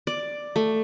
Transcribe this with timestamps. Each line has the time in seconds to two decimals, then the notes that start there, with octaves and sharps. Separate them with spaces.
0.07 D5
0.56 A3